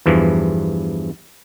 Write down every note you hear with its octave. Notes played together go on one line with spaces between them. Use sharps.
E2 G2 E3 F3